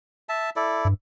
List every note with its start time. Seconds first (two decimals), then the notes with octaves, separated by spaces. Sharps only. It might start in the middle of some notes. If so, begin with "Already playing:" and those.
0.29 E5 A5
0.56 E4 A4 D5
0.85 G2